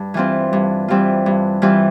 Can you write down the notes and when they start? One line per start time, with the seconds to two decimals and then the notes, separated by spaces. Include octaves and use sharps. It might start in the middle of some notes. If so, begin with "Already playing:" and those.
Already playing: G2
0.14 E3 G3 C4 F4
0.53 G2
0.88 E3 G3 C4 F4
1.26 G2
1.62 E3 G3 C4 F4